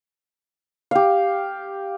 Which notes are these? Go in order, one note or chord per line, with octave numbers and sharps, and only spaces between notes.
G4 F5